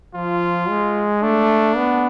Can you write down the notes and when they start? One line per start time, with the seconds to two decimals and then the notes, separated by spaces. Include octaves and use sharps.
0.15 F3 F4
0.69 G#3
1.22 A3 D4
1.76 B3